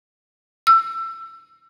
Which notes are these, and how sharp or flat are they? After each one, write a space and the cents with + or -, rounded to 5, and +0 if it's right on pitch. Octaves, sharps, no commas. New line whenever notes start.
E6 +25